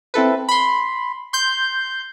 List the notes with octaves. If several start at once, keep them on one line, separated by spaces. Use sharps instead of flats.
C4 E4 A4 B4
B5 C6
C6 G6